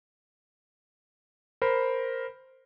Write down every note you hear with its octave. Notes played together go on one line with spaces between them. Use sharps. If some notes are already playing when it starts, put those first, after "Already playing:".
A#4 C5 B5